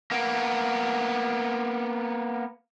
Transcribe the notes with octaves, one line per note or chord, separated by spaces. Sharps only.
A#3 B3